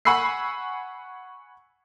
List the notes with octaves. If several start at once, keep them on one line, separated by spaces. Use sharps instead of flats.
F#5 G#5 B5 C#6 E6 C7